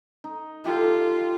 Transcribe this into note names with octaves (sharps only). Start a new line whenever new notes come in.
D#4
F4 G4 A4